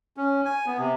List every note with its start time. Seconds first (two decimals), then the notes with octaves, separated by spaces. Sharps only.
0.17 C#4
0.45 G#5
0.66 B3
0.78 C3